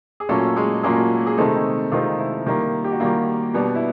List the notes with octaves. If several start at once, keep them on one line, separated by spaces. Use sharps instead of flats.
G#4
A#2 F#3 A3 A#3 C#4 A4
G#3 G#4
A#2 F#3 G#3 A#3 C#4 G#4
G#4
C3 D#3 G#3 A3 C4 D#4 A4
C3 D#3 G#3 C4 D#4 F4
E4
D#3 G3 A#3
G4
F#4
D#3 G3 A#3 F4
B2 G3 B3 D4
E4